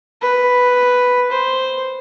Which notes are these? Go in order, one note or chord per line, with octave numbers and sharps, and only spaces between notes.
B4
C5